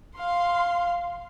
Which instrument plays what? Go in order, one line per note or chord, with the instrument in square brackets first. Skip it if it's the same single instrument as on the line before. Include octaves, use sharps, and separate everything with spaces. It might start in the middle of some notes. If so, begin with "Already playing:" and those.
[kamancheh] F5 C6